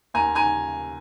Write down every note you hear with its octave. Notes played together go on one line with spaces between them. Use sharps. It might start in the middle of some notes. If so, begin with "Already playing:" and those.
D#2 G#5 A#5
G#5 A#5